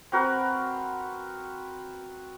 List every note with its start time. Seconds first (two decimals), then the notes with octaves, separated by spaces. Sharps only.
0.12 C4 F#4 A#4 B4